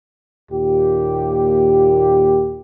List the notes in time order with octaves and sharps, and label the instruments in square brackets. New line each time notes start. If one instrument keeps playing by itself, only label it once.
[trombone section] D#2 A#2 G4